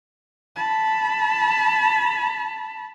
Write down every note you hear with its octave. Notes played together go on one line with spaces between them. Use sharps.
A5 B5